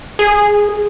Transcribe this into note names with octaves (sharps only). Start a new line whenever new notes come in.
G#4